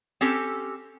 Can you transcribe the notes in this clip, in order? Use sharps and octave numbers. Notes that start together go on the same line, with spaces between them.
C4 C#4 G4 A4